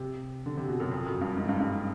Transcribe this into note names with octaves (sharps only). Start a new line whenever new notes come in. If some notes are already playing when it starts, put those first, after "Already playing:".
Already playing: C3
D3
C3
B2
F#2
F2
F#2
G2
G#2
G2
G2